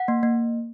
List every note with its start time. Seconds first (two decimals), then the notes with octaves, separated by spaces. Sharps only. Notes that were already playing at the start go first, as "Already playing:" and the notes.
Already playing: F#5
0.08 A#3
0.23 A#3